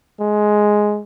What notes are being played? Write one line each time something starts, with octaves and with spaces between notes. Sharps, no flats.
G#3